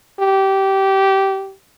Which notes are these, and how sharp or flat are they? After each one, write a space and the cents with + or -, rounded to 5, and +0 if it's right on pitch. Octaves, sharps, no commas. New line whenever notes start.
G4 -20